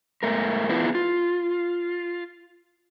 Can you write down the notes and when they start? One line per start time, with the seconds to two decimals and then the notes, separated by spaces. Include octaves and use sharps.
0.23 G#2 A3 A#4
0.69 B3 E4 F4 G#4 B4
0.95 F4